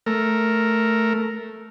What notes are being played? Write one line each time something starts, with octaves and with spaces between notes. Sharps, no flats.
A3 A#4